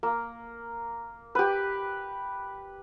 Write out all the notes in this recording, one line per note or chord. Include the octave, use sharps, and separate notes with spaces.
A#3
G4 B4